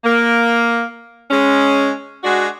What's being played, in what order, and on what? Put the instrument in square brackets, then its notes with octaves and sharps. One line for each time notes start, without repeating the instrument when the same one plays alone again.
[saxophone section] A#3
G#3 C#4
G#3 D4 F#4